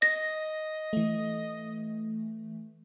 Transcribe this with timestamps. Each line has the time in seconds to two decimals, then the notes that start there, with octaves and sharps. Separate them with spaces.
0.02 D#5 A#6
0.93 E3 A3